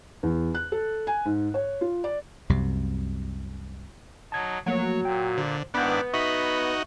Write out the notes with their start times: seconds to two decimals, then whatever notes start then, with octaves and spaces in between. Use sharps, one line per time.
0.23 E2
0.55 F#6
0.72 A4
1.07 G#5
1.25 G#2
1.54 C#5
1.81 F4
2.04 D5
2.50 C2 F#2 C3
4.32 F#3 D#4 A5 G#6
4.66 F3 F#3 A3 A#3 C#5
5.05 A#2 G5
5.38 D3 C5
5.74 G#2 D#3 B3 D4 E4 F#6 G6
6.14 D#4 F#4 E5 B5 C#6